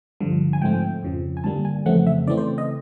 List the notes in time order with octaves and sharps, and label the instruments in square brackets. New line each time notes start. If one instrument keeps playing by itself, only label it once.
[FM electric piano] G2 D3 F3
G#5
G#2 F3 A3 C4 G5
F2 C#3 F3
G#5
G2 D3 G3 A#3 A5
G#5
F2 C#3 E3 A3 C4 F#5
E5
C#3 E3 A3 C4 D5
C5
D#5